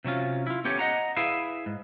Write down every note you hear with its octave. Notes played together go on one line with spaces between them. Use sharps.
C3 F#3 C#4 F4
E4 F4
B3 C#4 G4 A4 C#5
D#5 F#5 A#5
E4 G#4 B4 E5 F5
G#2